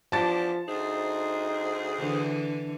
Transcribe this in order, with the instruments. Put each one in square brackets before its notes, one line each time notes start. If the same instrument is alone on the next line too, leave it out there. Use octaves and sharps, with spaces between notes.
[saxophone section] E2 D4 G4 [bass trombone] F3 [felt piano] A5 A6
[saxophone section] D2 G#4 C5 [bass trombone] D#4
[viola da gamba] D3 E3